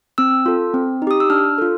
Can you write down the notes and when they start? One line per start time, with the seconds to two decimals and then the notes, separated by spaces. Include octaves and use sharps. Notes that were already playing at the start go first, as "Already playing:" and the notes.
0.18 C4 E6
0.46 F4 A4
0.74 C4
1.02 D#4
1.07 G4 D#6
1.20 E6
1.30 D4 F6
1.58 F4 A4